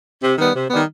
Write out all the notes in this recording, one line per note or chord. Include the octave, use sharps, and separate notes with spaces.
C3
D#3 G3 B3
C3
D#3 G3 B3